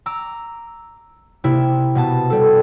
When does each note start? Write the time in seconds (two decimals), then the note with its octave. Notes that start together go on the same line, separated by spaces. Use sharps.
0.06 A#5 D6 E6
1.44 C3 A#3 E4
1.95 B2 B3 A5
2.30 G3 A4